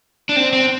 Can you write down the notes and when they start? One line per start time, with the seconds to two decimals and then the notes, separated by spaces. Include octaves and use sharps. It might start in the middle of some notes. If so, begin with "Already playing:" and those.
0.29 D4
0.36 C4
0.53 C4